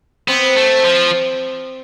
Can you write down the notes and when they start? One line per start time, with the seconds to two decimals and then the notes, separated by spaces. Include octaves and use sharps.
0.28 B3 C4
0.57 A3
0.84 F3